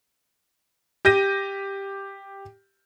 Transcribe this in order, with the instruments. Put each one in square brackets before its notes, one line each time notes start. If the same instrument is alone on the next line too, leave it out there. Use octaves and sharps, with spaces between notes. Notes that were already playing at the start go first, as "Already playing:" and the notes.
[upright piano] G4 G6 A#6 D#7